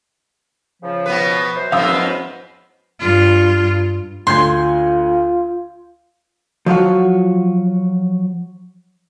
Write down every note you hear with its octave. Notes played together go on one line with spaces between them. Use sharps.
C#3 F3
B2 B3 B4
E3 F#3 C5
F2 G#2 B3 F5 D#6 E6
D#5
G2 F4
D2 F4 C6 G6 G#6
F3 F#3 F4 F#4